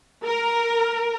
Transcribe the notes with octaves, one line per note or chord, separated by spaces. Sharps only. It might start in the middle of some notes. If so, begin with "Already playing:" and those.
A#4